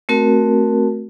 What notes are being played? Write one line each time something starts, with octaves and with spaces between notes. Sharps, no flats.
A3 C4 F#4 A#4